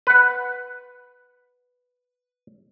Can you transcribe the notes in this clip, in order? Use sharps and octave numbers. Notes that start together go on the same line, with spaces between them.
B4 F#5